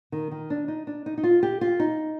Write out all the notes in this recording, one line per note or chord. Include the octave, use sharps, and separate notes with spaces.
D#3
D#3
D4
D#4
D4
D#4
D#4
F4
G4
F4
D#4